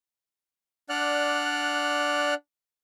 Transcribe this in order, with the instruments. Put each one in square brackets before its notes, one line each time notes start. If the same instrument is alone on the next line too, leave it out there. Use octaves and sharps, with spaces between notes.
[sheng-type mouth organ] D4 D5 F#5 F6 F#6